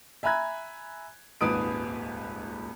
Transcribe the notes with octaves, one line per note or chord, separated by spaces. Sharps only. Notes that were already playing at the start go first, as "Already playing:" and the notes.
E5 G#5 A#5 B5 F#6 G#6
D#1 G#1 C#2 B4 D#6 D7